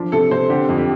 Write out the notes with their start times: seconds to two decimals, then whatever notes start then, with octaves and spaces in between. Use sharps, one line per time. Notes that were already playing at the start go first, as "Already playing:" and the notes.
Already playing: F3 D4
0.12 C3 A4
0.31 C3 C5
0.50 D3 G4
0.69 F2
0.78 G4